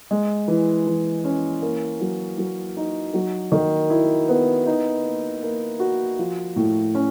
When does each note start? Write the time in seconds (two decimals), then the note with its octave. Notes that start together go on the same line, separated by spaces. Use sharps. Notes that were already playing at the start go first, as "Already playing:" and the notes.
0.11 G#3
0.48 E3
0.87 E3
1.25 C#4
1.62 A#3
2.01 F#3
2.38 F#3
2.77 D#4
3.14 F#3
3.52 D#3
3.90 E4
4.29 B3
4.66 D#4
5.04 A#3
5.43 A#3
5.80 F#4
6.19 F3
6.56 A2
6.95 C#4